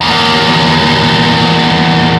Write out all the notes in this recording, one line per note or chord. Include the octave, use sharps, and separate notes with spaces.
E2 A#3